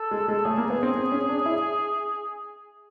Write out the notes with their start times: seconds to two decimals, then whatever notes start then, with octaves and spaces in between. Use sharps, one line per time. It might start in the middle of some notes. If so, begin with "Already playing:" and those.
Already playing: A4
0.11 G#3
0.28 G#3
0.45 A3 G#4
0.58 A#3
0.70 B3
0.83 C4
0.96 C4
1.12 C#4
1.29 D4
1.46 E4